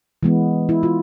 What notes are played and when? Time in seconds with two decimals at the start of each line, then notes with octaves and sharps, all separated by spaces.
0.23 E3 G#3 B3
0.69 E4
0.83 F4